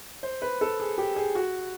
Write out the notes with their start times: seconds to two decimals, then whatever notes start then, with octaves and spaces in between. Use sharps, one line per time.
0.23 C5
0.42 B4
0.61 A4
0.80 G#4
0.98 G4
1.16 G#4
1.35 F#4